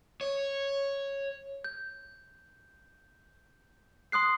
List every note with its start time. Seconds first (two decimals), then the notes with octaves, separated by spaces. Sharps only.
0.21 C#5
1.64 G6
4.12 C6 D#6 F#6 C7